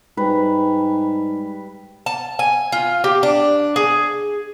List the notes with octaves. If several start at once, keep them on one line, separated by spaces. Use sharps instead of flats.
G#2 G3 B4
A5
G#5
F4
G4
D4
G#4